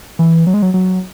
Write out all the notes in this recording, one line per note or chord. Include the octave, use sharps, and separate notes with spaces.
E3
F#3
G#3
F#3
F#3